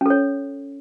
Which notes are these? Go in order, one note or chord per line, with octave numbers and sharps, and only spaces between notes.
C#4 A4 C#5